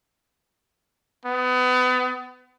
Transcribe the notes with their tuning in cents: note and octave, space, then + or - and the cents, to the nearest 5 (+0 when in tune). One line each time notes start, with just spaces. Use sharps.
B3 +30